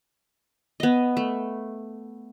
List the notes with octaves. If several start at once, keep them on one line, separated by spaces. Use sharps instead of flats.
B3 D#5
A3